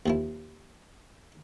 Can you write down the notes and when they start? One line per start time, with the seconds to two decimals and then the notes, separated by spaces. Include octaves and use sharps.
0.06 D#2 F3 E4